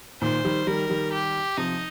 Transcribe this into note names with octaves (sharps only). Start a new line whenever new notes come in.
A#2 D#3 C5
D#3 G3
D#3 G3 A#4
D#3 G3
G4
C3 F3 D#4